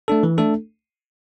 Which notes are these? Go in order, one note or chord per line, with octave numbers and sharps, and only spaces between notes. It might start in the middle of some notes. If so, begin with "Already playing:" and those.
A3 D4 A4
E3
A3 D4 A4